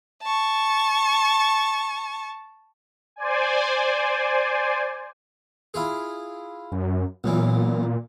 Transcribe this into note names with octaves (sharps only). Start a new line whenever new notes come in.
A5 C#6
C5 D5 G#5
E4 F4 G#4
F#2
B1 F#2 A#2 E3